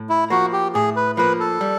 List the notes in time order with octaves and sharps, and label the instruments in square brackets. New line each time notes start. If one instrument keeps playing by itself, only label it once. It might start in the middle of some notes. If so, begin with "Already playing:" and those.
Already playing: [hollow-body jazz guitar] A2
[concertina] E4
[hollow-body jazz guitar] F3 A#3 [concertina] F#4
[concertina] G4
[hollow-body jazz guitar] A2 [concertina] G#4
[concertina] B4
[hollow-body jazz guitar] F3 A#3 [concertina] B4
[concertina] A4
[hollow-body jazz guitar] G3